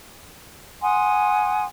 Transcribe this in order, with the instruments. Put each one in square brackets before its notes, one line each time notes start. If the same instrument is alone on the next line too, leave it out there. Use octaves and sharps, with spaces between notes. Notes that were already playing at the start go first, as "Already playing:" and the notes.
[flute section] F#5 G#5 C6 D#6